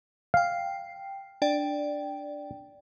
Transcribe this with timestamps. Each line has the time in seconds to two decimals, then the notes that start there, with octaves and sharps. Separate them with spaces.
0.34 F5 G5 C7
1.42 D4 D5 G5